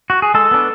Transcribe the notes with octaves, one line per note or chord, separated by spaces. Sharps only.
F#4
G#4
G#3 A4
B3 D4